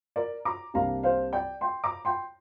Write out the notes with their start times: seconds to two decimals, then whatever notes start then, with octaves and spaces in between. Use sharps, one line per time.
0.16 A#4 D5
0.45 A#5 D6
0.74 C2 C3 A#3 D4 F5 A#5
1.03 C5 F5
1.33 D5 G5
1.61 G5 C6
1.84 A#5 D6
2.05 G5 C6